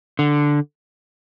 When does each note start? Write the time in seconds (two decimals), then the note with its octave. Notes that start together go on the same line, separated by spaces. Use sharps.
0.19 D3